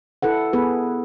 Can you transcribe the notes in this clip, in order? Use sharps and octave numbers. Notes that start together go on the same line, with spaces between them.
E4 A4 B4 F#5
B3 G#4 B4